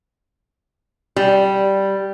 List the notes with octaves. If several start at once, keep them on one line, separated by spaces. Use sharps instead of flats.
G3